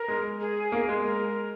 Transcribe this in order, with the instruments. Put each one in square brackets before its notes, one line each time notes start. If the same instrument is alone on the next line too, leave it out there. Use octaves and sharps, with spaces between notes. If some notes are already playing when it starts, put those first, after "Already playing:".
Already playing: [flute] A#4
[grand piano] G#3
[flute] G#4
[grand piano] A#3
G#3
[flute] A#4